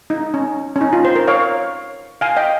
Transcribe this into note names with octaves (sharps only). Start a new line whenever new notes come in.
D#4
C#4
C#4
D#4
F4
C5
A#4
C#5 F5
F5 G#5
D#5 G5